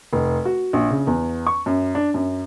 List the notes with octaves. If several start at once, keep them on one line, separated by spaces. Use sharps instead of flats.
F1
F#4
A#1
C#3
E2
C#6
F#2
D4
F#2